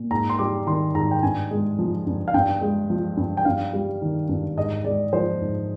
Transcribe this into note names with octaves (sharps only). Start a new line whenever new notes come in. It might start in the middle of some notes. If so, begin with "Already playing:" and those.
Already playing: A#2
G#2 A#5
C6
G3 D6
D#3 C6
G#2 A#5
G5
G2 G#5
G#3
F3
G2
F5
G2 G5
G#3
F3
G2
G5
G2 F5
G3
D#3
G2
G#2 D#5
G#3 D5
F3 C5
G#2